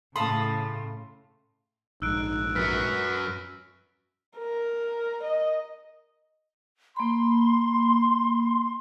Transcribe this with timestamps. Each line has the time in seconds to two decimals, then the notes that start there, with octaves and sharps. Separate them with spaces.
0.16 A2 C#3 A4 F5 A5 B5 C6 D#6
2.02 A#1 G#2 D#4 E6 F#6 D7
2.55 F#2 F#3 B4 F6 B6
4.37 A#4
5.23 D#5
6.96 A#3 B5 C6